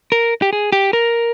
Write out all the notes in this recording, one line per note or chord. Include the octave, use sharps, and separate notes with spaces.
A#4
G4
G#4
G4
A#4